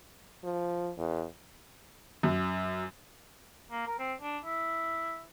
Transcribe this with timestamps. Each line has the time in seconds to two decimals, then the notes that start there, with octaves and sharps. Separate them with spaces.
0.44 F3
0.98 E2
2.23 F#2
3.71 A#3
3.87 A#4
3.99 C4
4.21 D4
4.45 E4